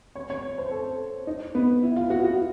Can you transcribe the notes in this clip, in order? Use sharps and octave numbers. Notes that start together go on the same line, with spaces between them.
C#5
C#5
C5
A4
D#4
B3
E4
F4
F#4
F#4